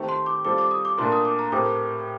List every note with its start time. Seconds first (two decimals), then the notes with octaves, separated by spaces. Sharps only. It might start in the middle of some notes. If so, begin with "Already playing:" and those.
Already playing: D#3 A3 C4 G4
0.09 C6
0.26 D6
0.45 G3 C4 F4 A4 D6
0.58 D6
0.71 D#6
0.85 D6
0.98 A#2 A3 D4 F4 A#4 C6
1.12 D#6
1.25 D6
1.39 A#5
1.52 A2 A3 C4 G4 A#4 D6